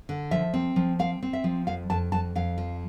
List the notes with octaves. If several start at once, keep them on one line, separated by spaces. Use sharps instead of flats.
D3
F3 E5
C4
F3
C4 F5
C4
E5
F3
F2 F5
F2 A5
F2 A5
F2 F5
F3